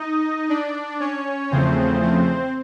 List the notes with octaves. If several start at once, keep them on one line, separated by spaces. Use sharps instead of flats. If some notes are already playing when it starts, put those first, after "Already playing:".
Already playing: D#4 D#5
D4 D5
C#4 C#5
E2 C#3 F3 A3 C4 C5
C4 C5